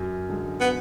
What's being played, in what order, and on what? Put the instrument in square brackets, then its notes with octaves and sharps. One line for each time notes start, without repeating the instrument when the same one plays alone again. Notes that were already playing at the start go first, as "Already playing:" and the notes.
Already playing: [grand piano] F#2
D3 G#3
[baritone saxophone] B3